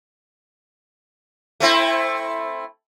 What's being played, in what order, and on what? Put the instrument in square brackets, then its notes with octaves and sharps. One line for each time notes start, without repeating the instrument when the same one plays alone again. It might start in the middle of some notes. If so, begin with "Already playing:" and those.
[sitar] A3 C4 E4